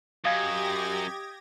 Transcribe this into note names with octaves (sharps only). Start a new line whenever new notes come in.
F#2 G4 D#5 F5 G#5 G#6 A#6